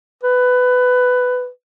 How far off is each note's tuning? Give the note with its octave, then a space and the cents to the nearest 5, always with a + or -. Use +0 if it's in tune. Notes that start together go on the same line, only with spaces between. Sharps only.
B4 +15